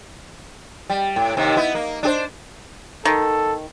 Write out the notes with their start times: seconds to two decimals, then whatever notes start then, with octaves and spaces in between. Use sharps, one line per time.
0.90 G3
1.16 A2
1.37 D#2 C3 D#3
1.57 B3 E4
1.75 A#3
2.03 D4 G#4 C5
3.05 D#3 A4